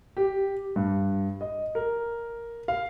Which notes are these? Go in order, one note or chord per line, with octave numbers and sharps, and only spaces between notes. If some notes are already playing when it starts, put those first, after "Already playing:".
G4
G2
D#5
A#4
F5